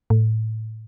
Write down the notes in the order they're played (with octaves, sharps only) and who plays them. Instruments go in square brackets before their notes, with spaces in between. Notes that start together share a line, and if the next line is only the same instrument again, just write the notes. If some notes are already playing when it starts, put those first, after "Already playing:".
[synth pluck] A2